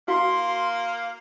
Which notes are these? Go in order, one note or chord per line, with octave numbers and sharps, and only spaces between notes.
A#3 E4 F#4 F5 C6